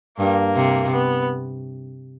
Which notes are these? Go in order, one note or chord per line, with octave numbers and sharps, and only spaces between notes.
G2 A#3
C3
B3